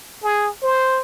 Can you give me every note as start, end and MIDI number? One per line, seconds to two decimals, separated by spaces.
0.24 0.49 68
0.63 1.02 72